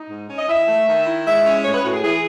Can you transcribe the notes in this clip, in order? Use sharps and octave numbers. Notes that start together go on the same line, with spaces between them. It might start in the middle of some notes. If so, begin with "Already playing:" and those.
Already playing: D#4
G#2
C#4
D#5
E3 E5
A3
D#3
E4
G#3 E5
C#4
A2 C#5
B4
A2 F#4
G#4
E3 G#4